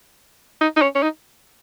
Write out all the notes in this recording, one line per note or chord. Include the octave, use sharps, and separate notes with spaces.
D#4
D#4
C#4
C#4
D#4